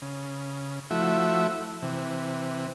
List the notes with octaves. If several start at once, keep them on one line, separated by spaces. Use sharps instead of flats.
C#3
F3 A3 E4 F#4 E5
C3 E3